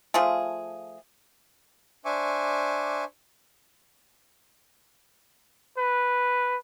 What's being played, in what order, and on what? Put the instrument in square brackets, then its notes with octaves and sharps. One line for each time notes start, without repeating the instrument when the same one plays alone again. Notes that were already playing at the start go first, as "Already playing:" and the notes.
[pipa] F3 A3 F4 G#4
[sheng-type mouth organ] D4 C5 E5 G#5 C#6 D6
[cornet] B4